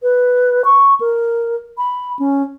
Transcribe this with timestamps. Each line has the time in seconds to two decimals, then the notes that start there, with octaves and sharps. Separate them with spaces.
0.03 B4
0.65 C#6
1.01 A#4
1.78 B5
2.19 C#4